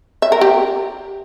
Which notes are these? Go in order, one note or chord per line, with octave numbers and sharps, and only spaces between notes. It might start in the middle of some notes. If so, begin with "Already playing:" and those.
E5
A#4
G4